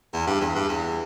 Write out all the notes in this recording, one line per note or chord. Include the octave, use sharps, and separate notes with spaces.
E2
G2
E2
G2
E2